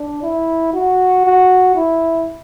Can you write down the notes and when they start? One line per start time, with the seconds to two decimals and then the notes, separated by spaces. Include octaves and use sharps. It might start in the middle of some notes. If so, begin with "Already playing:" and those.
Already playing: D4
0.23 E4
0.74 F#4
1.25 F#4
1.76 E4